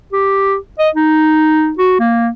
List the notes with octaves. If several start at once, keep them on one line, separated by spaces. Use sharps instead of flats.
G4
D#5
D#4
F#4
A#3